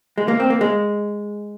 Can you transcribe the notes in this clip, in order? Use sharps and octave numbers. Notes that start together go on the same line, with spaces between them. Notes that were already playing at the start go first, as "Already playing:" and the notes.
G#3
A#3
C4
A#3
G#3